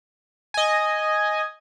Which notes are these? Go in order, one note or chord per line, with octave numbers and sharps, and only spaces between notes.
D#5 G#5